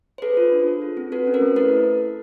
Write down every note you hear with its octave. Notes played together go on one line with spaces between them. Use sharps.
C5
G#4 A4 B4
F4
D4
A4
F4
C4
F#4 A4 B4
C#4
A#4 C5
A3
E4 A4 B4